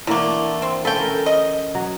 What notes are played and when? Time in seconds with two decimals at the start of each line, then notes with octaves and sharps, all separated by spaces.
0.07 D3 E3 A3 A#3 D4
0.62 C4
0.85 C#4 A4 B4 G5
1.00 A#4
1.26 D#5
1.75 F#3